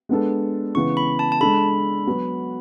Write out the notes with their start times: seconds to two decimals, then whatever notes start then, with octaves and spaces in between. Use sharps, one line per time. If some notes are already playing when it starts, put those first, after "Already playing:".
0.09 G#3 B3 D4 A4
0.75 C#3 E3 B3 C#6
0.97 B5
1.19 A5
1.32 A5
1.40 G#3 D4 A4 B5
2.07 F#3 B3 F#4